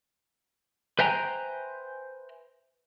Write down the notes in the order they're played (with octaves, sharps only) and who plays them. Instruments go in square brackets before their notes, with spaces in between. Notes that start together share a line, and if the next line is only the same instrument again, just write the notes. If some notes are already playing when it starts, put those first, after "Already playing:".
[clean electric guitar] B4 C5 E5 G5 G#5 A#5